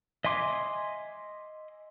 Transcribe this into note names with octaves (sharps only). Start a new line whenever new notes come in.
D#5 E5 G#5 C6 D6